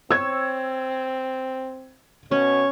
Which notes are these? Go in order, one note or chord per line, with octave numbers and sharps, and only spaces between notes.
C4 C#5 E6 G#6
B2 C#4 C#5